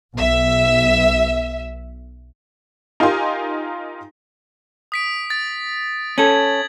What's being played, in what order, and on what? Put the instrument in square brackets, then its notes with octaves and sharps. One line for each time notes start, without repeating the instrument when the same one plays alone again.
[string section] B1 E5
[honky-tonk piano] D#4 F4 G4 A#4 G#5 C6
[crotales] D#6 B6 D7
A6
[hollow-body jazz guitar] C#4 A4 [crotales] G#6 F#7